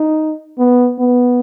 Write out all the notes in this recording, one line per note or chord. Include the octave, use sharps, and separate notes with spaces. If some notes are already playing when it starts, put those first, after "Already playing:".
Already playing: D#4
B3
B3